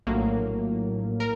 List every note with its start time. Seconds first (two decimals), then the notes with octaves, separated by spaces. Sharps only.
0.07 A#1 A2 F#3 A#3
1.20 A#4